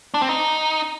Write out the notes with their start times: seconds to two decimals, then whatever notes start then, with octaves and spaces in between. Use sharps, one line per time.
0.14 D4
0.22 C4
0.29 D#4